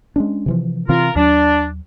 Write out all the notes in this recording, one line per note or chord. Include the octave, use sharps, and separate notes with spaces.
G#3 C#4 D4
C3 E3 F3
C3 E3 C4 F4 A#4
D#2 F#3 D4